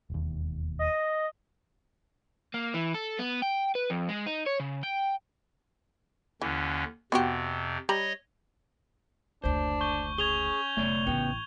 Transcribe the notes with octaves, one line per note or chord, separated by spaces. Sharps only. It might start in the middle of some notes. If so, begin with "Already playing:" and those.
E1 D#2
D#5
A#3
E3
A4
B3
G5
B4
F2
G#3
D#4
C#5
C#3
G5
D#2 D3 E3 C#4
F2 C3 B3 F#4 G4
G3 C#5 D#5 A#5 B5
F#1 D2 D4 C5
C#6 G6 G7
C#4 G#4 G#6 F7 G7
F1 A3 C#5 D5
A1 C#3 B3 D4 G5